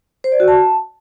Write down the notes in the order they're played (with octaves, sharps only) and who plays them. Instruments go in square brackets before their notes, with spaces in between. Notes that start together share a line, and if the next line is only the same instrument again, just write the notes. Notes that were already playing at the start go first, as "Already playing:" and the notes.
[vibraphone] C5
D5
F#4
A5